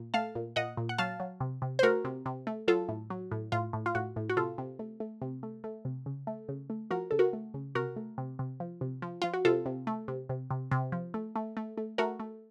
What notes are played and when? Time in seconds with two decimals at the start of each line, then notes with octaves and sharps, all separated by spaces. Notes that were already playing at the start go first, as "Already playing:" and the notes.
Already playing: A#2
0.14 A3 F5 A5
0.35 A#2
0.56 A#2 D#5 F#5
0.77 A#2
0.89 F#5
0.98 F#3 F5 A5
1.20 F#3
1.40 C3
1.62 C3
1.79 C5
1.83 A3 F#4 A#4
2.05 C3
2.26 C3
2.47 A3
2.68 F#3 F4 A4
2.89 A2
3.10 F#3
3.31 A2
3.52 A2 F4
3.73 A2
3.86 F4
3.95 A2 F#4
4.16 A2
4.29 F#4
4.37 C3 F4 A4
4.58 C3
4.79 A3
5.00 A3
5.22 C3
5.43 A3
5.64 A3
5.85 C3
6.06 C#3
6.27 A3
6.49 C#3
6.70 A3
6.91 F3 F#4 A#4
7.11 C#3 A4
7.19 F#4 A#4
7.33 A3
7.54 C#3
7.75 C3 F#4 A#4
7.96 A3
8.18 C3
8.39 C3
8.60 F3
8.81 C3
9.02 F3
9.22 F3 F4
9.34 F#4
9.45 C3 F4 A4
9.66 C3
9.87 A3
10.08 C3
10.29 C3
10.51 C3
10.71 C3
10.92 F3
11.14 A3
11.36 A3
11.57 A3
11.78 A3
11.98 A3 F#4 A#4
12.20 A3